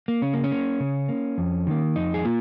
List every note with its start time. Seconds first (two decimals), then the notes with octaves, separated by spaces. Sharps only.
0.08 A#3
0.22 C#3 C#4
0.33 A#3
0.44 C#4
0.51 A#3
0.80 C#3
1.09 A#3
1.38 F2
1.67 D#3 A#3
1.96 F2 D#4
2.14 G#4
2.25 A#3 F4